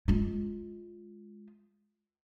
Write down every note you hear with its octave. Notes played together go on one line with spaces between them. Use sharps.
G#3 F4